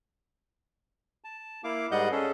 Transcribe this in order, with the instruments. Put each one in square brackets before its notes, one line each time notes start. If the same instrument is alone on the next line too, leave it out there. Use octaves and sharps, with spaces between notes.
[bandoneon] A5
A#3 E4 F5 D6
G#2 G3 D#5 F#5 G6
C#4 G#4 A4